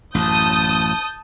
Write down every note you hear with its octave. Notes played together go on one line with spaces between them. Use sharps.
A1 F#2 A5 D#6 G6